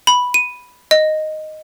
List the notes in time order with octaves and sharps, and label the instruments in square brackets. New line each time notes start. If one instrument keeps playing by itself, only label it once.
[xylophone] B5
D#7
D#5